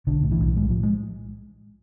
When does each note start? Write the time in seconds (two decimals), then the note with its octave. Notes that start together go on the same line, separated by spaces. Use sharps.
0.07 B1 D3
0.23 A2
0.31 E3
0.40 B1
0.57 A2 G#3
0.70 F3
0.83 G#3